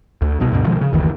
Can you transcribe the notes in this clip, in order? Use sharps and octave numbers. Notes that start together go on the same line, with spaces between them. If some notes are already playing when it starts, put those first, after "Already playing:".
D2
C2 B2
D2 G2 B2
B2 D#3 F3 G#3
C#3
F#1 D2 D#3 E3